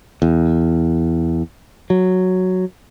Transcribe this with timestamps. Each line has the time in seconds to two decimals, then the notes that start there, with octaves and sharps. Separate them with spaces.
0.22 E2
1.90 F#3